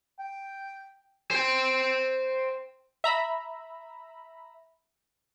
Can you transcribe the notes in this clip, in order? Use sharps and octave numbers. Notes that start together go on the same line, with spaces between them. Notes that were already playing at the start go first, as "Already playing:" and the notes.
G5
C5 G5
E5 A#5 B5